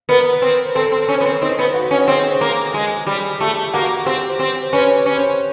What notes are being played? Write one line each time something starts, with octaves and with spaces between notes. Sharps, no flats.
B3 A#4
C4
C4 A4
C4
C#4
B3
C4
C4 D#4
B3
F#4
C#4
C4 G#4
A#3
G#3
G3
A3 G4
A#3 F#4
C4 G4
C4
C#4 B4
C#4
C5